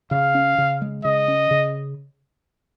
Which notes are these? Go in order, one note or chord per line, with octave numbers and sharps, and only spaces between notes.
C#3 F5
C#4
C#3
G#3
C#3 D#5
C#4
C#3